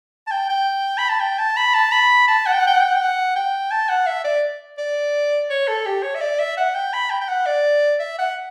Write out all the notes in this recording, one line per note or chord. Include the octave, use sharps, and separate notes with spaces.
A5
G5
G5
B5
A5
G5
A5
B5
A5
B5
A5
F#5
G5
F#5
G5
F#5
G5
F#5
G5
F#5
G5
A5
F#5
E5
D5
D5
C#5
A4
G4
C#5
E5
D5
E5
F#5
G5
B5
G5
G5
F#5
D5
E5
F#5